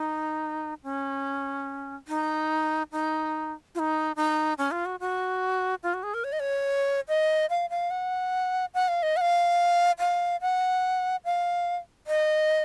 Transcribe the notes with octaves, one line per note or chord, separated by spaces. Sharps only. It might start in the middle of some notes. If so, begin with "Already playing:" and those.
Already playing: D#4
C#4
D#4
D#4
F4
D#4
D#4
C#4
F4
F#4
F#4
F4
F#4
G#4
A#4
C#5
D#5
C#5
D#5
F5
F5
F#5
F#5
F5
D#5
F#5
F5
F5
F#5
F5
D#5